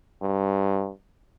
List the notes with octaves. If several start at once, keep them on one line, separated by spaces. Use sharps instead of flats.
G2